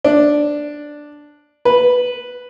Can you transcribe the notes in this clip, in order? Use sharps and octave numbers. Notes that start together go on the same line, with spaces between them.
D4
B4